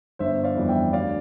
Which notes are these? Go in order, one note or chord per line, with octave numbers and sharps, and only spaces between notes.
G1 C5 E5
D5 F5
F2 E3 G3 B3
E5 G5
D2 D5 F5